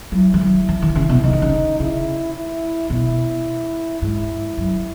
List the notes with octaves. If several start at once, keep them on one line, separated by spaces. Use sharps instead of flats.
F#3 E4
E3
F#3
E3
D#3
C#3
B2
C#3 D#4
D#3
C#3
C#3 E4
E4
B2 E4
G#2 E4
F#2